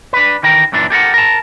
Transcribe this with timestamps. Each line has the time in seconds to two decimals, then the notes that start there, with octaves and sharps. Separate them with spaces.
0.13 D4 B4
0.43 D#3 E3 A#4 G5
0.72 F#2 A#2 E3 D4
0.90 G4 A4 A#4 F#5
1.14 A#4 A5